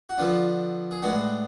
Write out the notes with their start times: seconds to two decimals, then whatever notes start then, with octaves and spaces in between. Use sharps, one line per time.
0.09 F#4
0.18 D3 F3 B3 D4 F4
0.91 G#4
1.02 A2 G#3 B3 D4 F#4